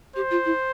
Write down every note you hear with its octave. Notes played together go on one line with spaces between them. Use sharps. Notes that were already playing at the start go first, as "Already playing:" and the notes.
G4 C5
F4
E4